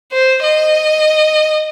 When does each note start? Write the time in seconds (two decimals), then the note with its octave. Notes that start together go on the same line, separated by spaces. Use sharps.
0.12 C5
0.43 D#5